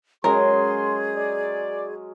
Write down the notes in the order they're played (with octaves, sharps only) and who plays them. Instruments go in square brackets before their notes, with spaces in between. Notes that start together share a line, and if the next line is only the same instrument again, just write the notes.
[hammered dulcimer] F#3 G#3 C#4 [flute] G#4 [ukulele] A#4 [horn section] C6
[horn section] D5